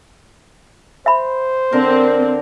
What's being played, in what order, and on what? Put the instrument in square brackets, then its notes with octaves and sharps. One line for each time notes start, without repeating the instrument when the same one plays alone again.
[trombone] C5 [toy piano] E5 B5
[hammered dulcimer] D3 A#4 [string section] C4